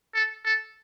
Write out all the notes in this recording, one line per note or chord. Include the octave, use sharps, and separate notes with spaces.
A4
A4